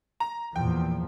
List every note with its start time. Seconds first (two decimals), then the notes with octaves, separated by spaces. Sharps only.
0.20 A#5
0.56 E2 A#2 F3 G5